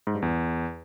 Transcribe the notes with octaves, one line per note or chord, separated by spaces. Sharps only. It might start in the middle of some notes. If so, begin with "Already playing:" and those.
G#2
G2
E2